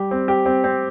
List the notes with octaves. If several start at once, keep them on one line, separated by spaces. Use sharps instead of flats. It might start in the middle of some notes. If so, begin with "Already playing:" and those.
Already playing: G3 G4
C4
G4
C4
C4